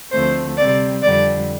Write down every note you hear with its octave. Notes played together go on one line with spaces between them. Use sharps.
D2 D3 F3 A3 C4 C5
C3 G3 C4 D5
F2 D3 G3 D5